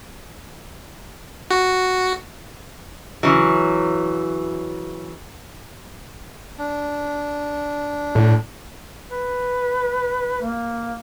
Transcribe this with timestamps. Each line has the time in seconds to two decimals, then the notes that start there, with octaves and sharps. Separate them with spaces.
1.51 F#4
3.23 C#3 E3 F#3
6.58 D4
8.15 A2
9.12 B4
10.41 A#3